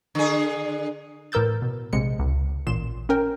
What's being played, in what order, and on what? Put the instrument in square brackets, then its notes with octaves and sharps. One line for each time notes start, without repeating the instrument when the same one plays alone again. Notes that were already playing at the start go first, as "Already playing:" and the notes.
[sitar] D3 G#4
[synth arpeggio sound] A2 E3 A#4 E6 G6 A6
B2
A#1 C3 G#3 C#7
C#2
A1 A#2 C6 E7
C#4 A#4 G5